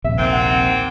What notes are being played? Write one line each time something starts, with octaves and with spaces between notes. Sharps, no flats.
D#1 A#1 C3 E5
G#2 A#3 C4
F#5